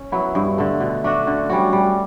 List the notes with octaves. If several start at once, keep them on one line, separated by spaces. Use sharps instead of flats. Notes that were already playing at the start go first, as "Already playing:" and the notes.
Already playing: C#4
F#3 B3 E4
G2
D3 A3
B2
A3 D4 F#4
D3
G3 C#4 F#4
G3